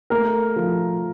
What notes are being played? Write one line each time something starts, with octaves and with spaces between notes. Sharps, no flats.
A3 A#4
F3